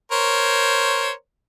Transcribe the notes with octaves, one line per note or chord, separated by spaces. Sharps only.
A#4 C5 C#5